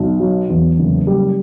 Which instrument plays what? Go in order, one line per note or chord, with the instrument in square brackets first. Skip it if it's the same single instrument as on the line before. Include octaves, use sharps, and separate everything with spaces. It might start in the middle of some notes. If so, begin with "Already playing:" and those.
Already playing: [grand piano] B1
F#3
E2
F#1
G3